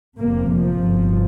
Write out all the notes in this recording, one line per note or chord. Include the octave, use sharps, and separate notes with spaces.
F1 F2 C3 A#3
F3
G1 G2